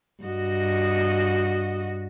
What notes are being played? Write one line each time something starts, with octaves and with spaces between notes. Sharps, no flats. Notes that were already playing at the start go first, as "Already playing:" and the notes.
G2 F#4 D#5